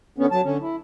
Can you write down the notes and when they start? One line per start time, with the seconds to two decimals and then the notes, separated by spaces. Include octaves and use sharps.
0.18 D3 B3 C#4
0.31 F#3 A5
0.44 D3 C#4
0.61 E4